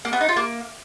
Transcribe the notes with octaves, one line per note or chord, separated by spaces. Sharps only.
A#3
B3
D#4
F4
A#3